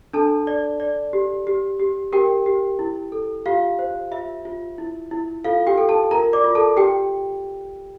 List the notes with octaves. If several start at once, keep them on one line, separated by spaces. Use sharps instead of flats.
D4 A4 A5
D5
D5
G4
G4
G4
G4 A#4 G5
G4
E4
A4
F4 G4 F5
C5
F4 E5
F4
E4
E4
F4 A4 F5
G4 G5
A4
A4 A5
F4 A#4 A#5
D5 D6
F4
A4 A5
G4 G5